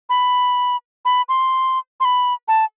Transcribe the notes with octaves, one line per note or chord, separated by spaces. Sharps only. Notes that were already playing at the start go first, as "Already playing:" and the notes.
B5
B5
C6
C6
B5
A5